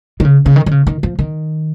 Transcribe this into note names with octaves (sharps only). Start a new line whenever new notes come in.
D#3
C#3
C#3
D#3
D#3
C#3
D#3
F3
D#3